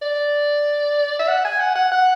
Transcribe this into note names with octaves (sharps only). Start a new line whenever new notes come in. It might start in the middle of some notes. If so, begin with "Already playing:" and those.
D5
E5
F#5
G#5
F#5
F#5
F#5